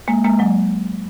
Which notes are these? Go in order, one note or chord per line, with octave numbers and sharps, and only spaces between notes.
G#3 A#3
G#3 A#3
F#3 G#3